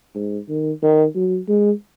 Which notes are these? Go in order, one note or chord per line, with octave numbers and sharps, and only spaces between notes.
G#2
D#3
D#3
F#3
G#3